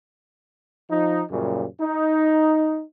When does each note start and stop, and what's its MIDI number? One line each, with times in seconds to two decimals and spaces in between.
0.90 1.22 53
0.90 1.22 63
1.31 1.65 42
1.31 1.65 46
1.31 1.65 49
1.31 1.65 53
1.31 1.65 55
1.80 2.82 63